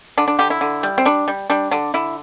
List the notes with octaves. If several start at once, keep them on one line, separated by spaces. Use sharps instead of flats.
D3 D4
D4
D3 G4
E4
D3
G3
C4
G3 D4
G3
G3 D4
D3 D4
D3 E4